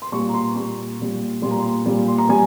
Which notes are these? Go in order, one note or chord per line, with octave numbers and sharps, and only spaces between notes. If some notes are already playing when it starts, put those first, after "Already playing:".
C6
A#2 G3 C#6
A#5
C6
A#2 G3 C#6
A#2 G3
A#2 G3 C6
A#5
C6
A#2 G3
C6
A#5
G3 G#5